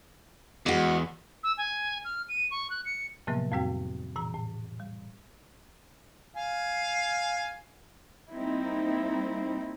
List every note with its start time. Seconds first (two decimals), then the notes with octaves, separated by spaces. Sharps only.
0.66 E2 G#3 F#4
1.44 E6
1.58 G#5
2.05 F6
2.29 D#7
2.51 C#6
2.70 F#6
2.85 C#7
3.27 A2 C3 F3 F#3 A#3 B3
3.52 F2 A2 G3 C4 F#4 G5
4.16 A#2 E3 A#5
4.35 A2
4.80 G3
6.36 F5 G#5
8.31 G3 A#3 C4 D#4 E4